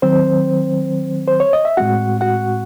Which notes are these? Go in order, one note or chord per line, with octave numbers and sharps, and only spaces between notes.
D#3 F#3 C4 C5
C5
C#5
D#5
E5
A2 G#3 C4 F#4 F#5
F#4 F#5